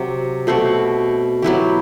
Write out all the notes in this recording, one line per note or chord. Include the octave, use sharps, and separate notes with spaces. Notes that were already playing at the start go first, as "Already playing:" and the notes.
Already playing: C3 F#3
B2 A3 C4 F#4
F#3 B3 E4 G4